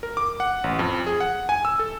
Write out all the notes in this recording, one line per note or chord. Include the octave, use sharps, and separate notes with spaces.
A#4
D6
F#5
A1
F2
G#4
F#5
G#5
E6
A4